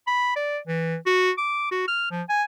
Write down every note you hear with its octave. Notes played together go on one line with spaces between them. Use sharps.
B5
D5
E3
F#4
D6
F#4
F6
F3
G#5